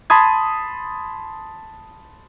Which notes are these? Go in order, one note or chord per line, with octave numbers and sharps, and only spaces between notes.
A5 B5 C6 D#6 G#6